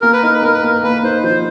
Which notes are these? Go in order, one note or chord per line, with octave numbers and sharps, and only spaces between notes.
A#3 A#4
B4
D#4 A#4
B4
A#3 A#4
B4
A#3 A#4
A#3 B4
D#4 C5
F3 C5